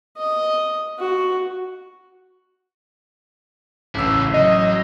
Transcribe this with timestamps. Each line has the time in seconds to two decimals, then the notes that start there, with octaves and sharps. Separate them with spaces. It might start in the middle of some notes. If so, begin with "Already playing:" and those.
0.17 D#5
0.99 F#4
3.95 A1 C#3 E4 E6
4.34 F#3 D#5